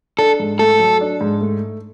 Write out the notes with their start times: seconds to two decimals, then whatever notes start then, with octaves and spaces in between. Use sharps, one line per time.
0.19 D4 A4
0.40 G#2
0.59 A3 A4
0.79 F#3
1.01 D4
1.21 G#2
1.41 A3